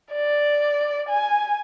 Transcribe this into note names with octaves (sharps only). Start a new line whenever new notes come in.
D5
G#5